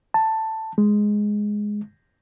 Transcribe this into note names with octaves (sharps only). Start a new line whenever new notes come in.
A5
G#3